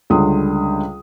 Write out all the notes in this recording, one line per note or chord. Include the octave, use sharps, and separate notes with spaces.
C#2 D3 G3 C6 D#6